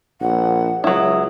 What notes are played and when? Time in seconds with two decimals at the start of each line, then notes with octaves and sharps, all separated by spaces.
0.21 A#1 F#5
0.84 C#2 F#3 E4 D#6